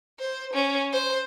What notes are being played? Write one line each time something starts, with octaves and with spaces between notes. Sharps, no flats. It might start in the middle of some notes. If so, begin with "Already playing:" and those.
C5
C#4
C5